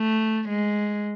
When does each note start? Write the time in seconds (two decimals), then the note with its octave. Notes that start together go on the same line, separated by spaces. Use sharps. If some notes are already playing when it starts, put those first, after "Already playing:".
Already playing: A3
0.49 G#3